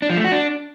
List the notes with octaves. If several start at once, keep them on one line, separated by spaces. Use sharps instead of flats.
D4
F3
A3
F#4
D4